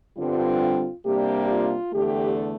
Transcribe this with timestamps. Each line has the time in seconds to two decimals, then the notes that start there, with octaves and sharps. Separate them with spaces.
0.17 G2 D3 G3 C4 F4
1.05 C3 G3 A#3 D4 G4
1.49 F4
1.93 E2 D3 A3 G4